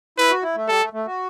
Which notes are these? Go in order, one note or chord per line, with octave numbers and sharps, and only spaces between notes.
E4 B4
F#4
E4
A3
G3 A4
A3
A3
F#4